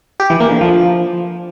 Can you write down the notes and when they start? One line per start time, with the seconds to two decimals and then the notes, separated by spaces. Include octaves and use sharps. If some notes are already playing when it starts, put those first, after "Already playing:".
0.20 G4
0.30 E3
0.40 A#3
0.51 D3
0.61 F3